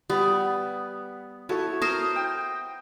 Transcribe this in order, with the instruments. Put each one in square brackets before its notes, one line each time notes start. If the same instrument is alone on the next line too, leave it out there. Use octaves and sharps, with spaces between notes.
[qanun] G3 [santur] B3
[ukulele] E4 F#4 A4 [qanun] C#5
[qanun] A#4 C5 [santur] D#6
[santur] G5